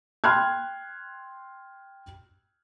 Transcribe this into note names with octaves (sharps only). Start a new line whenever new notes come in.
G5 C6 F6 F#6 G#6